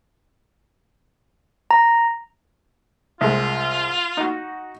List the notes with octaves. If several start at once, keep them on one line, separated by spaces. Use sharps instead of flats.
A#5
C2 G#3 F4
D#4 F#4